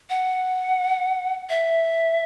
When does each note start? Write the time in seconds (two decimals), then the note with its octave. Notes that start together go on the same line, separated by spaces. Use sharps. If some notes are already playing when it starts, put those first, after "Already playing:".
0.10 F#5
1.49 E5